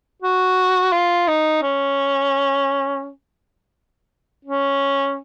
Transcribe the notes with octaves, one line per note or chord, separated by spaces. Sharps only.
F#4
F4
D#4
C#4
C#4